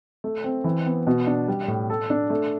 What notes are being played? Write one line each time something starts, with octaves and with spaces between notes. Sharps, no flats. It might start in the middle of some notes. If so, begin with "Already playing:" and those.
A3
C4
E3
B3
B2
D4
G3
A2
A4
D4
A3